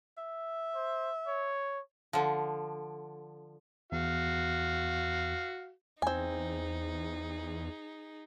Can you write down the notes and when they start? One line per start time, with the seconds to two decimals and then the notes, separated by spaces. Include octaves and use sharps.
0.18 E5
0.75 C5
1.28 C#5
2.13 D3 F3
3.92 E2 F#4 F5
6.02 E2 C4 D#4 G#4 G#5